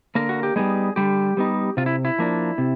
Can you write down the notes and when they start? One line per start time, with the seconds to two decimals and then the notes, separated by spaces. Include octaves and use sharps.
0.15 D3 A#3 A#4
0.29 F#4
0.43 G4
0.56 G3 G#3 B3 D#4 G#4
0.96 D3 G3 G4
1.37 G3 B3 D#4
1.77 C3 F4
1.86 E4
2.05 E4
2.18 F3 A#3 D4
2.58 C3